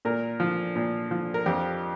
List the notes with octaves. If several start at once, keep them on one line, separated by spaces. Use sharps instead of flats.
A#2 A#4
F3
A#2
F3
A#4
F2 G4